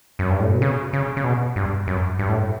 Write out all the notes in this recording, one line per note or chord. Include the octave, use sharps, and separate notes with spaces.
F#2
G2
A2
B2
C#3
C#3
C#3
B2
G2
F#2
G2
A2